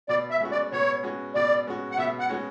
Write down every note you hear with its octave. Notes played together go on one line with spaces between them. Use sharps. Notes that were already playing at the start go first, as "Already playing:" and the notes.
B2 D5
E5
G#3 C#4 F#4
D5
B2 C#5
G#3 C#4 F#4
B2 D5
G#3 C#4 F#4
F#5
B2 E5
F#5
G#3 C#4 F#4